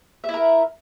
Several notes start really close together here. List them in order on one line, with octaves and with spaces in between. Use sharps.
E5 E4 A#4